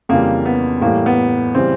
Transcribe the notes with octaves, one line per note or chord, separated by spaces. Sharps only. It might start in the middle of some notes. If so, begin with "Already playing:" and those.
F2 C#3 E3 G3 A#3
B3
A2 E3 G3 A#3
B3
C#3 E3 G3 C4